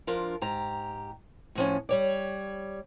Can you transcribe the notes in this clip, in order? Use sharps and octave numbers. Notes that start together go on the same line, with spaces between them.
F3 D4 F4 A#4
G#2 G4 A#5
A2 F3 C#4
G3 C#5 D5